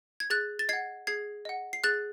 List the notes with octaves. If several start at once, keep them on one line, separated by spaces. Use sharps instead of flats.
G#6
G#4 F#6 A6
A6
D#5 F#5 G#6 C7
G#4 G#6 C7
D#5 F#5
C7
G#4 F#6 A6